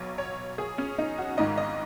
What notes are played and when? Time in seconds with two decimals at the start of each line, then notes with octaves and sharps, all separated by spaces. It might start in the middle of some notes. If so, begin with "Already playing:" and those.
Already playing: B1 B2 F#3 C#5
0.18 C#5
0.58 G#4
0.78 C#4
0.98 D#4
1.18 F#4
1.37 G#1 G#2 D#3 G#3 D#5
1.58 D#5